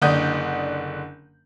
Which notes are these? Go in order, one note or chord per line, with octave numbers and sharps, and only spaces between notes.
F#1 D3 D4 D#6 G6